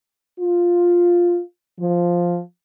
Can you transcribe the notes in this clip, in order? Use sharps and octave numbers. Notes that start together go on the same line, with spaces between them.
F4
F3